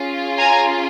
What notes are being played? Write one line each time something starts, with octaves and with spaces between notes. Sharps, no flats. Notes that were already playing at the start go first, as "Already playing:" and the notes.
Already playing: C#4 F4 G#4
G#5 A#5